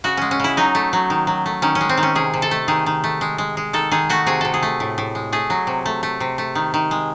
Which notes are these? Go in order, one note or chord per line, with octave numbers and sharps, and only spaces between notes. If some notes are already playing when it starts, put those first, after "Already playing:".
C#3 F#4
G#3 C#4
C#4
C#3 E4
F#3 D#4
A3
F#3
D#3
F#3
A3
D#3 C#4
C#4
G#3
C4
D#3
C#4
C3 G#4
C3
A4
A3
D#3 G#4
D#3
A3
G#3
G#3
G#3
D#3 A4
D#3 G#4
A3 F#4
C3 G#4
C3 A4
G#4
A3
A2
A2
G#3
A3 G#4
F#3
C3
A3
A3
C3
A3
D#3
D#3
G#3